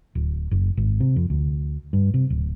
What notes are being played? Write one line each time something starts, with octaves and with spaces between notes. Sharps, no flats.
D1
F#1
G#1
C3
F2
D2
G2
C3
D1